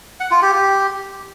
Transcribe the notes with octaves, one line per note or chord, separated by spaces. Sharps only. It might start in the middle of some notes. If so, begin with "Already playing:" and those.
F#5
F4
G4
G4